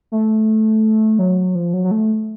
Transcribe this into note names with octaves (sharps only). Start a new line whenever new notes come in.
A3
F#3
F3
F#3
F#3
A3